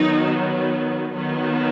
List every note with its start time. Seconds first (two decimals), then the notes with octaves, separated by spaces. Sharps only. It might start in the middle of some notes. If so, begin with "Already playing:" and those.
Already playing: D#3 F#3 B3 D#4
1.13 D#3 F#3 B3